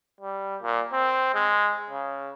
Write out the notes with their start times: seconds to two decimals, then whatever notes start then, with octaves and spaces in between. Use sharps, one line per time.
0.21 G3
0.62 A#2
0.93 C4
1.35 G#3
1.90 C#3